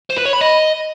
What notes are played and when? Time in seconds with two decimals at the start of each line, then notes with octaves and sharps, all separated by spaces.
0.10 C5
0.18 B4
0.26 C#5
0.33 B5
0.41 D#5